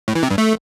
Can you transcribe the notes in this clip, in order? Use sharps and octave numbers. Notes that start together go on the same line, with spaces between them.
A2
E3
C3
G2
A3